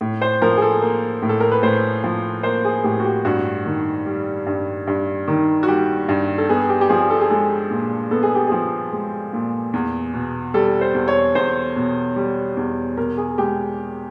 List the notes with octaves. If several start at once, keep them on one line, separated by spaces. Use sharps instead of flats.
A2
C5
F3 A#4
G#4
A4
A#3
A2
A4
A#4
B4
A2 C5
F3
A#3 C5
G#4
A2 G4
F#4
G4
G2 F#4
D#3
G3
G2
G2
D#3
F#4
G3 G4
G2
A4
B3 G#4
G4
G4
F3 G#4
A4
G#4
G#3 A4
A#2
B3 A4
G#4
G4
F3 G#4
G#3
A#2
E2
B2
G3 A4
C5
E2
C#5
E2 C5
B2
G3
E2
B2 A#4
G#4
G#3 G4